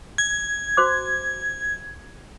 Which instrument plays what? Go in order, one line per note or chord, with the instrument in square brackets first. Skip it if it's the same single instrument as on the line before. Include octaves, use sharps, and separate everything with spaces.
[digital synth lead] G#6
[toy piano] F#4 C5 D6